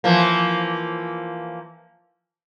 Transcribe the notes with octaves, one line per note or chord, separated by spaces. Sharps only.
E3 F3 A#3